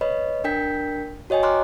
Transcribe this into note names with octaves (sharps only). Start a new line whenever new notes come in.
B4 C#5 D#5 B5
D4 A#4 G5 G6 B6
F#4 C#5 D#5 G5 G#5
G#5 A#5 C6 D6 F6 F#6